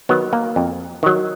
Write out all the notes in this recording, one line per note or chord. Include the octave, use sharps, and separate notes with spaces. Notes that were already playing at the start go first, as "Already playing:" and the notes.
D#3 F#3 B3
A#3
F2
D#3 F#3